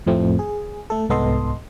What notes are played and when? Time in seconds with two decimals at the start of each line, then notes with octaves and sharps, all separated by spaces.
0.06 F2 A2 F3 A3 C4
0.39 G#4
0.90 A3 A4
1.10 C2 G#2 B3 A4 D#5 C6